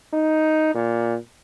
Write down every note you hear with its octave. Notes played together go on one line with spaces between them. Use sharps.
D#4
A#2